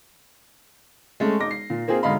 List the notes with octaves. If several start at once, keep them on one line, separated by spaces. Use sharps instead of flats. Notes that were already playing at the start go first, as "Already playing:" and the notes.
G#3 A3 C#4
E1 D#4 D6 A#6
C7
A#2
A#3 C4 F4 G#4
E1 G#2 D3 D#5 F5 B5